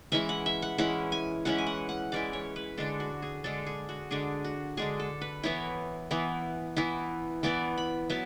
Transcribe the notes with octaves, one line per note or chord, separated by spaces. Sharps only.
E3 G#3 C#4 E4 E5
F#5
E5
F#5
E3 G#3 C#4 E4 F#5
G#5
E3 G#3 C#4 E4 F#5
G#5
F#5
F#5
E3 G#3 C#4 E4 D5
C#5
B4
D3 G#3 D4 A4
F#4
G#4
D3 G#3 D4 A4
G#4
F#4
D3 G#3 D4 G#4
F#4
D3 G#3 D4 G#4
A4
B4
E3 B3 E4 C#5
E3 B3 E4
E3 B3 E4
E3 B3 E4 D5
B5
F#3 B3 E4 A5